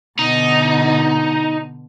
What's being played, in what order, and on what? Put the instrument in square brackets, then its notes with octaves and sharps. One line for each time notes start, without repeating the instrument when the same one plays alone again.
[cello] B2 D3 [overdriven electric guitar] D#4